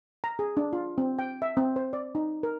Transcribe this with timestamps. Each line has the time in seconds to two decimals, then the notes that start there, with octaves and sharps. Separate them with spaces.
0.24 A#5
0.39 G#4
0.57 D4
0.73 F4
0.98 C4
1.19 G5
1.42 E5
1.57 C4
1.76 C5
1.93 D5
2.15 D#4
2.43 A#4